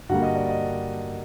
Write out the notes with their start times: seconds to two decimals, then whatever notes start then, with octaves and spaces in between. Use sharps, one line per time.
0.09 G2 D3 G3 A#3 F#4 F#5
0.22 D#5
0.36 D5
0.49 D#5